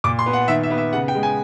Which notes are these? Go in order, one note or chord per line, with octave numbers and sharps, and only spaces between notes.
A#2 D6
C6
B3
F#5
D#3 E5
E5
B3
E5
C#3 F#5
G5
G#3
G#5